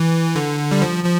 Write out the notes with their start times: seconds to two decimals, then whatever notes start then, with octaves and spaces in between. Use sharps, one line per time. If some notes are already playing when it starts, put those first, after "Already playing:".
Already playing: E3
0.36 D3
0.71 G3
0.82 F3
1.04 F3